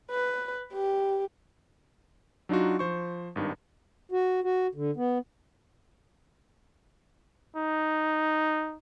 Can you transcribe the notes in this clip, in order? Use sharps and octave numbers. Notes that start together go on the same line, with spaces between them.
B4
G4
F#3 D4 D#4 F4 F#4
F3 C5 C#6
G#1 G2 D#3
F#4
F#4
D3
B3
D#4